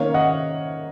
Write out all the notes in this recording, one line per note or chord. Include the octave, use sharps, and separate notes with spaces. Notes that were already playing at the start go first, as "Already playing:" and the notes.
Already playing: D#3 A#3 C#4 C#5 F5
D#5 F#5